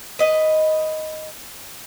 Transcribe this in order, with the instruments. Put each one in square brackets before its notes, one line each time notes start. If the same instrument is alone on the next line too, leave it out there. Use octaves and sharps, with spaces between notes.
[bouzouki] B4 D#5